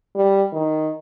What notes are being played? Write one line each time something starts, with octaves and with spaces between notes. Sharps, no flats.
G3
D#3